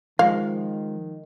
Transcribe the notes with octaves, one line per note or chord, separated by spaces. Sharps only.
D#3 F3 G#3 F5